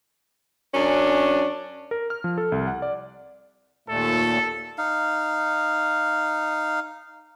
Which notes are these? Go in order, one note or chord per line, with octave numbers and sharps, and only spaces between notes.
F#2 C#4 D4
A#4
F6
F3
A4
C2
F#5
D5
D#2 A#2 A3 A4
D#4 F5